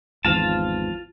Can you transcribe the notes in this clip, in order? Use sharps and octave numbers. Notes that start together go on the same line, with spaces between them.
G#1 E2 F3 F4 A5